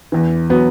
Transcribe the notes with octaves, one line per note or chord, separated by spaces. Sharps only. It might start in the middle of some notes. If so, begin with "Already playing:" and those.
E2 E3
F#3 B3